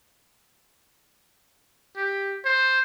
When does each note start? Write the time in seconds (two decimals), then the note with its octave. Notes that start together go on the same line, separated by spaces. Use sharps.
1.97 G4
2.45 C5